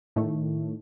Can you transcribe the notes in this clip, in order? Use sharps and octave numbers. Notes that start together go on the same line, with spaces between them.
A2 D#3 A3